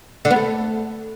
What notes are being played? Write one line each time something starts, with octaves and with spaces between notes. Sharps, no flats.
D3
B3
A3